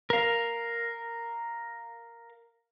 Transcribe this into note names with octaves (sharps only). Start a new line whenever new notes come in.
A#4 F5